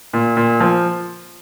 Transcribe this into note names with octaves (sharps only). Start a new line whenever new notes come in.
A#2
A#2
F3